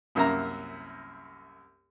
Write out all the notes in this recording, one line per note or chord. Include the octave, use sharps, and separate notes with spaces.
C2 F#2 A#3 E5 A#5